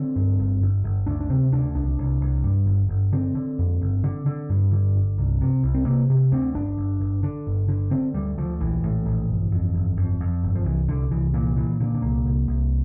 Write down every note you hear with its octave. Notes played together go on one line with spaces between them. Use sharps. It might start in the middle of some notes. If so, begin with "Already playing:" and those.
Already playing: D3 C4
G2
G1
G1
G1
D2 D4
D4
C3 C4
D2 D4
C2 D4
C2
C2
G2
G1
G1
D3 C4
D3
F2
G1
D3
D3
G2
D3
G1
C2
C3
C2
C4
C3 A#3
C3
D2 C4
G1 D4
G1
G1
D3
G1
D3
D3 C4
D2 G3
D2 F3
A#1 E3
A2
A#1
G1
F2
G1
F2
F2
G1
F3
C2 E3
C2 D3
C2 E3
A#2 E3
A#2 E3
A#2 D3
D3
C2 A#3
C2
C2